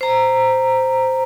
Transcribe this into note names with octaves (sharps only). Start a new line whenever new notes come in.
C5 A#5